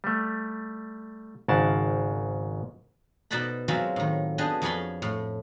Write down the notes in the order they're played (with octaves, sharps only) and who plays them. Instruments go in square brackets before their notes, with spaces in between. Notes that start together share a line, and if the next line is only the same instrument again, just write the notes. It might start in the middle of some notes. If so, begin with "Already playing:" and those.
[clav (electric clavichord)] G3 A3
G#1 G#2 C#3 A#4 F#5 A5
[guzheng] B2 D#4 C5 D5 F#5 B5
F#3 G#3 C4 F4 E5
A2 D#3
B3 D4 G4 G#4 D#5
F2 G#4 C#5 F5 B5 C6
A2